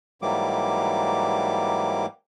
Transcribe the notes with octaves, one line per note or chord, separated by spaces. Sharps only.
G#2 E3 F#3 G3 A#3 D6